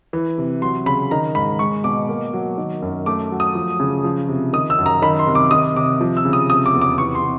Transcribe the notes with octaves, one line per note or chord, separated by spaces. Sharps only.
E3
C3
F#3 C6
C#3 B5
D#3 A#5
G#2 B5
G#3 C#6
B2 D6
A#3
F#3
D#3
F#2
A3 D6
F#3
D#6
F3
C#3
F3
C3
D#3 D#6
E6
F#2
A#5
D#3 B5
C6
C3
D6
D#3 D#6
C3 D6
F3
E6
C#3
D#6
C3 D#6
D6
E2
D6
E3 C#6
C6
C3